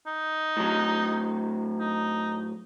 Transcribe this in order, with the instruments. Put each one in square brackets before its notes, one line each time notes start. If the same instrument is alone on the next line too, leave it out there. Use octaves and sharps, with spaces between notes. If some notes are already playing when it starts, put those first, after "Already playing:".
[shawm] D#4
[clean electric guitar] A2 F#3
[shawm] D#4